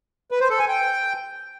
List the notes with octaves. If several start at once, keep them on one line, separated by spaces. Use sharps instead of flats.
B4
C5
A4
G#5
G5